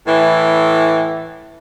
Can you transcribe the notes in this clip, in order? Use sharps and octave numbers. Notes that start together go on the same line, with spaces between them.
A2 E3